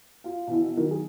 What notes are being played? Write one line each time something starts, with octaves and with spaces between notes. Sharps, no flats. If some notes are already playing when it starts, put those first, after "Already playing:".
F4 F5
B2 E3 E4
D#3 F#3
G#4